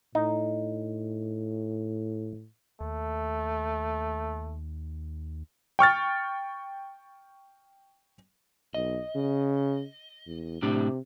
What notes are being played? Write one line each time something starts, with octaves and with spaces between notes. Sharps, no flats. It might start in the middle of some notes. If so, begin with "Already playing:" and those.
A2 D#4
D#2 A3
G5 C#6 F6 A6
B1 D#5
C#3
E2
A2 C3 D4 G4